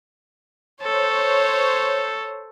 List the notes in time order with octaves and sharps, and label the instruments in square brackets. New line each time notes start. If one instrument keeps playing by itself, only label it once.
[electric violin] A4 [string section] C5 C#5